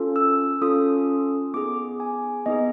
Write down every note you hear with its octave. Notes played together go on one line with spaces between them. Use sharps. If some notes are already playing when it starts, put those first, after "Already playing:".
Already playing: C#4 F4 A4
E6
C#4 F4 A4 D#6
B3 D#4 G#4 D6
G#5
B3 D#4 G#4 D#5